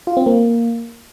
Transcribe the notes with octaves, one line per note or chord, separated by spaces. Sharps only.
F4
C4
A#3